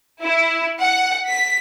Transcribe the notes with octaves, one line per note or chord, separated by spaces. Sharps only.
E4
F#5
B6